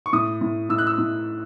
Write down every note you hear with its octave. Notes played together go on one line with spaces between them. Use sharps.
C#6
A2 D#6
A2
A2 E6
F#6
E6
A2